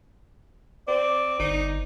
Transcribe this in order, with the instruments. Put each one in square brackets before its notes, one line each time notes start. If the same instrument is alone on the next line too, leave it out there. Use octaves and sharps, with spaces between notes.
[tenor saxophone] C4 [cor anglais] D5
[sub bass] G1 [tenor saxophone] D#4